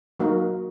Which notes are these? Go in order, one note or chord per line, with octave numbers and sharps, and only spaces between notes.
F#3 A#3 D#4 F#4 A#4